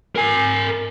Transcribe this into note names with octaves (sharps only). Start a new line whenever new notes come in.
A#4 G#5